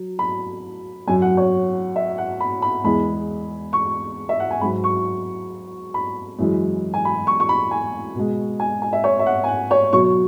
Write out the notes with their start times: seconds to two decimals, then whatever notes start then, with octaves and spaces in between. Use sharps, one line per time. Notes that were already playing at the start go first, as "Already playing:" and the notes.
Already playing: F#3
0.19 B5
1.08 F#2 F#3 G#5
1.22 F#5
1.37 C#5
1.96 E5
2.18 F#5
2.40 B5
2.62 B5
2.84 E2 E3 G#3 B5
3.73 C#6
4.29 E5
4.40 F#5
4.51 G#5
4.61 G#2 F#3 B5
4.84 C#6
5.94 B5
6.39 F#2 E3 G#3
6.94 G#5
7.05 B5
7.27 C#6
7.40 C#6
7.49 B5
7.71 G#5
8.15 B2 G#3
8.60 G#5
8.82 G#5
8.93 E5
9.04 C#5
9.19 E5
9.26 F#5
9.44 G#5
9.48 F#5
9.71 C#5
9.93 B2 F#3 C#6